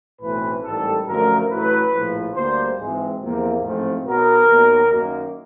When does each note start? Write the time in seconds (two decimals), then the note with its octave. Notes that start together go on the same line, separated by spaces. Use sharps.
0.20 B1 A2 E3 A3 C4 B4
0.63 A1 G#2 D#3 G3 A4
1.07 F#2 D3 F3 A3 A#4
1.48 A1 A2 F#3 A3 B4
1.92 A#1 A2 F3
2.34 D2 D3 G3 A#3 C5
2.77 G#1 G#2 E3 G#3 C4
3.19 E2 C3 F3 A#3
3.62 A1 G#2 F3 A3 C4
4.04 B1 B2 F#3 B3 A#4
4.47 D#2 D#3 F#3 B3
4.90 F#2 D#3 F#3 A#3